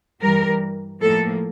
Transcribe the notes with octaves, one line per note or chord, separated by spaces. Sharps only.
G2 E3 G3 A#4
A2 F3 A#3 A4